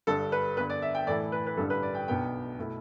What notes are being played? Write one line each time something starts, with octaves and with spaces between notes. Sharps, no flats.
G1 G2 G3 A4
B4
G2 D3 B3 B4
D5
E5
G5
A2 E3 A3 E4 D5
B4
B4
A1 G2 D3 G3 A4
B4
D5
G5
B1 B2 B3 D4 G5
B2 A3 E4